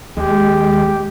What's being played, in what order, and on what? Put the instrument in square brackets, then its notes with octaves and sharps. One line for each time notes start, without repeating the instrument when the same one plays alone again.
[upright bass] D#2 [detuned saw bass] G#3 [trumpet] G4